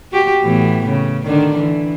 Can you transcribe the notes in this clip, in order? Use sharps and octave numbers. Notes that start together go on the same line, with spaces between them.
F#4 G4
A2 E3 B3
C#3
D3 D#3 D4
E3